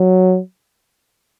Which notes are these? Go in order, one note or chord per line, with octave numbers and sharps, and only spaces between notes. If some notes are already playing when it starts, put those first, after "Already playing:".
Already playing: F#3